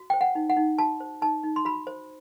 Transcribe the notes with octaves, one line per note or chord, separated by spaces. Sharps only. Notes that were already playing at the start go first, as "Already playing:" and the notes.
Already playing: F#4
C5 G5
F#5
D#4
F#5
D#4
F#4 A5
C5
D#4 A5
D#4
C6
F#4 B5
C5